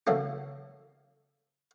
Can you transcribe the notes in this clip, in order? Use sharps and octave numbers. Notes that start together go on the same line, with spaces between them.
C#3 E3 F#3 A3 A#3 C#4